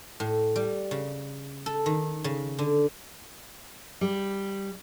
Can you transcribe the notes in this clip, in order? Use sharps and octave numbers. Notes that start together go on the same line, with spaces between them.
A2
G3
C#3
A4
D#3
C#3
D3
G3